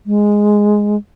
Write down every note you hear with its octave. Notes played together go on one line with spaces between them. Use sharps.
G#3